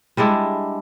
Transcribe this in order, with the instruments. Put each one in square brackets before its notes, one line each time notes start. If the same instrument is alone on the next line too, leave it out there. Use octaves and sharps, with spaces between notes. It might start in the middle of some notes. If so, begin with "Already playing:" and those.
[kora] G3 G#3 D4 E4